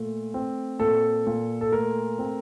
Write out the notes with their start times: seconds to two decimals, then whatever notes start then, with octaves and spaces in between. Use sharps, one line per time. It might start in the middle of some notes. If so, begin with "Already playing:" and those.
Already playing: A#2 A3
0.34 C4
0.79 A#2 A4
1.27 A#2
1.61 A4
1.72 A3 A#4
2.19 C4